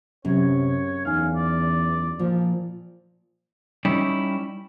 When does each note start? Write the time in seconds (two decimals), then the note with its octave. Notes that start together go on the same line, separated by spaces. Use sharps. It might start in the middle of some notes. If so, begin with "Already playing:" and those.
0.25 F#2 C3 C#4 C#5
1.05 E2 D#4 F5 G#5
1.35 D5
2.19 A#2 F3
3.85 G3 C#4 D#4 E4 G4